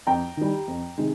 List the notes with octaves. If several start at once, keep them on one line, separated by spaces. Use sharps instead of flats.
F2 G5 A#5
D#3 G3
F2
C3 D#3 G#3